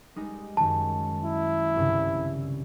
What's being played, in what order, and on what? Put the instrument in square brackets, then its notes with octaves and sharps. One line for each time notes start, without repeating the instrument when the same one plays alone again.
[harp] G3 G#3 D#4
[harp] F#2 D#3 G#3 [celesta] A5
[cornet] E4
[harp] C2 G2 C#3